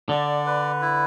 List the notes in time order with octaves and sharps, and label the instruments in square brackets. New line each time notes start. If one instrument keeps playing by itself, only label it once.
[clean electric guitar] D3 [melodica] D5
[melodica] B4
E4